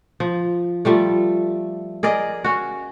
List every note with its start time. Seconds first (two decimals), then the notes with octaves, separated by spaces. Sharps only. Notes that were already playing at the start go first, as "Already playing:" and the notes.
0.20 F3
0.85 F3 G3 A3
2.03 G#4 A#4 D5 D#5
2.44 C#4 F#4